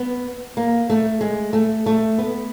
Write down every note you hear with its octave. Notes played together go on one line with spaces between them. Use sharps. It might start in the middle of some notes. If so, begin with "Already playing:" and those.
Already playing: B3
A#3
A3
G#3
A3
A3
B3